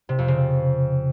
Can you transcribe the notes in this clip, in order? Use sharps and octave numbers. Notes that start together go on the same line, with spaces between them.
C3
F2
C#3